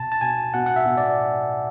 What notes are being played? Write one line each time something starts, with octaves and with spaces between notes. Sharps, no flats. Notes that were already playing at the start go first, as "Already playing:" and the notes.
Already playing: B2 A5
A5
B2 G#5
B2 F#5
F#5
E5
B2
D5